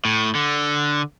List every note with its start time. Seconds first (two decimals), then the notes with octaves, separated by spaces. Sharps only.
0.05 A2
0.35 D3